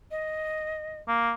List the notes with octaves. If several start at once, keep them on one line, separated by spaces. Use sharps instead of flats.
D#5
A#3